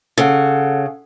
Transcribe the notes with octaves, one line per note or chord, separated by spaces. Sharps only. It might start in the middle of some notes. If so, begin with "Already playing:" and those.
C#3 A4 F#5